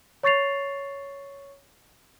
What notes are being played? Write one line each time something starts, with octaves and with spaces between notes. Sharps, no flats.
C#5 C#6 A6 C7 F7